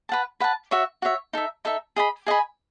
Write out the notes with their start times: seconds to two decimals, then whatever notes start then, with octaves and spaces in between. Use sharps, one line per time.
0.09 B4 F#5 A5
0.40 B4 F#5 A5
0.71 F#4 C#5 E5
1.02 F#4 C#5 E5
1.33 D#4 A4 E5
1.65 D#4 A4 E5
1.96 G#4 D#5 G#5 B5
2.27 G#4 D#5 G#5 B5